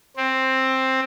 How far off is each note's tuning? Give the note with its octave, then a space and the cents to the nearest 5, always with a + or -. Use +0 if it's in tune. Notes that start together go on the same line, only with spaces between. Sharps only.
C4 +10